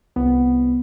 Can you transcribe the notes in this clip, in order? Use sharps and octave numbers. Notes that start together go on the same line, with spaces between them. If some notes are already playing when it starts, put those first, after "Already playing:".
C2 B3